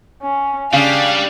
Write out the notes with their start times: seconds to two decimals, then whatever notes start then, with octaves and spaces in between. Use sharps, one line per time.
0.22 C#4
0.73 C#3 G3 D4 F5